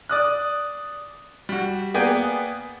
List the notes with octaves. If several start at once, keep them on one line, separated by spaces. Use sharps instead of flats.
D5 D#6 F#6
G3 F#4
A#3 B3 G#4 D5 G5 G#5